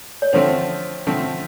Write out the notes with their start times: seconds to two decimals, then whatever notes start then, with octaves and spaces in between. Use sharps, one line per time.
0.22 C#5
0.33 D3 F3 A3 C4 C5
1.07 D3 F3 A3 C4